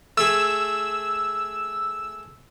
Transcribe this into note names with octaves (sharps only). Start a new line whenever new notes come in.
A3 G#4 E6